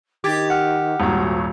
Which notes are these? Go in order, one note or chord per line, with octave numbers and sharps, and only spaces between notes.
D#3 G4 D6 G#6 A6
F#5 F6
D#1 G#1 F#4 A#5